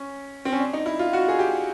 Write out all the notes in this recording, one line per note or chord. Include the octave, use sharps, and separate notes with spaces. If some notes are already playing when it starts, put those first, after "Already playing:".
Already playing: C#4
C4
C#4
D4
D#4
E4
F4
F#4
G#4
G4